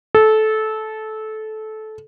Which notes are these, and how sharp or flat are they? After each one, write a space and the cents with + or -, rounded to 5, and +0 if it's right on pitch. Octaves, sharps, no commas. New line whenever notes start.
A4 -20